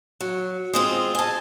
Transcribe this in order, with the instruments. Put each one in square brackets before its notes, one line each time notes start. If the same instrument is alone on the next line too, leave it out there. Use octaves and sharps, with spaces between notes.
[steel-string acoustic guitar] F#3
[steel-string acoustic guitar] G#3 C4 F4 [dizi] D#6
[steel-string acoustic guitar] D#5 A5 [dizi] G#5